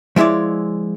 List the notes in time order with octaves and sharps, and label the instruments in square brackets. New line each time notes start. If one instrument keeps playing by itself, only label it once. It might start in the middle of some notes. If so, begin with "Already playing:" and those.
[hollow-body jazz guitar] F3 G#3 E4 C#5 D5